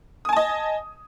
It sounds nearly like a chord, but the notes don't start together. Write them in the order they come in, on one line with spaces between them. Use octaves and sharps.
D#6 G#5 A5 D#5